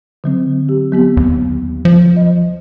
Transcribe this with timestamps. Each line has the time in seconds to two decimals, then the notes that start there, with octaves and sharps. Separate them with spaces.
0.24 D3 F#3 C4
0.69 G4
0.92 F#3 B3 G4
1.17 D#2
1.85 F3
2.16 D#5